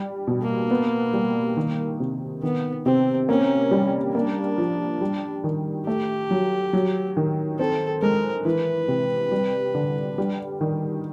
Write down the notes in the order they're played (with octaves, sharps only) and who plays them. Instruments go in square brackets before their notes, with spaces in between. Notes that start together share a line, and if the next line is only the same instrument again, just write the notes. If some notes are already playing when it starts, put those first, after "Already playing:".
Already playing: [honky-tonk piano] G3
B2
[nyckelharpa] A#3
[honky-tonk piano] B3
G3
D#3
C3
[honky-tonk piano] D#3 [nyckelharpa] B3
[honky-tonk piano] C3 [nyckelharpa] C4
[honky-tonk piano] A#3 [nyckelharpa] C#4
[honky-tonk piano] G3
[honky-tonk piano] A#3 [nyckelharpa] D4
[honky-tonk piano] F3
G3
D#3
[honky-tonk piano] A3 [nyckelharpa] G4
[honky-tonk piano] F#3
F#3
D#3
[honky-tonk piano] C4 [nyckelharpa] A4
[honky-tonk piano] G#3 [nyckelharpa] A#4
[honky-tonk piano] E3 [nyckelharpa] B4
[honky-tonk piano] C3
G3
D3
G3
D#3